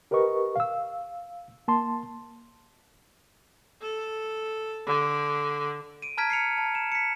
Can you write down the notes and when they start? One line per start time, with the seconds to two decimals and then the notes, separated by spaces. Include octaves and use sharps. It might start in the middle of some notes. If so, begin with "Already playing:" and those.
0.11 G4 A#4 B4 D#5 C#6
0.56 F5 E6
1.68 A#3 A5 C6
3.81 A4
4.86 D3
6.02 D7 D#7
6.18 A5 A#5 F6 G#6 B6 D7
6.30 C7 C#7 F7
6.58 A5
6.75 E7
6.92 B6 C#7